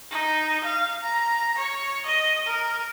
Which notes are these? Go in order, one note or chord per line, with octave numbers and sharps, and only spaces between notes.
D#4
F5
A#5
C#5
D#5
A#4